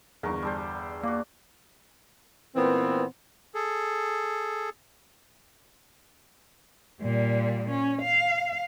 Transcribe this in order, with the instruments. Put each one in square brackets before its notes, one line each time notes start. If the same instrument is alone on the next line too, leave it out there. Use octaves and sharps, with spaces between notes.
[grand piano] G1 E2 [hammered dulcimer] A#4 C#6
[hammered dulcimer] G3 A4 C5
[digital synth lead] A#3 [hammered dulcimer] F#4 D5
[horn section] A#2 E3 B3 C4
[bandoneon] G#4 A4
[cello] A#2 G3
C#4
F5